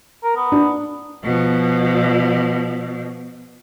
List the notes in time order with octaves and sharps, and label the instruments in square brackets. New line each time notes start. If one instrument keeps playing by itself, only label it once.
[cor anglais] A#4
B3
[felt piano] D4
[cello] B2 F3